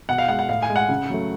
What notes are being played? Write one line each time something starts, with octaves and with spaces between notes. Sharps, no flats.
B2 F#5
F5
G#3 F#5
F#5
A2 F5
G#5
G#3
F#5
C#3
F#3 A3